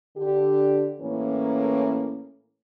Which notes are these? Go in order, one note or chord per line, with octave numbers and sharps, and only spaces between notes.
D3 G4
A2 E3 A#3 C#4